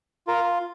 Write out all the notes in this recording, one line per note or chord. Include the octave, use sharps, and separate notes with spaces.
F4 A#4